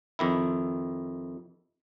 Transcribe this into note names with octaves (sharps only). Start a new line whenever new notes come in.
F2 D#3 E4